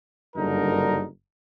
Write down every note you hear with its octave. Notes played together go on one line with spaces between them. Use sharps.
F#1 G2 D3 D#4 A#4